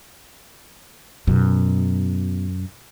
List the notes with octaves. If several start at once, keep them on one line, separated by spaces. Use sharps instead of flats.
F#2 B2